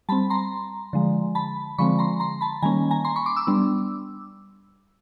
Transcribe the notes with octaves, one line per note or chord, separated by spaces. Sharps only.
G3 C4 A5 B5
A#5 C6
D3 F3 G#3
A5 B5
D3 F3 G#3 C4 B5 C#6
A#5 C6
A#5 C6
A5 B5
D#3 G3 A#3 C#4 G#5 A#5
G#5 A#5
A#5 C6
B5 C#6
C6 D6
D6 E6
G3 B3 D4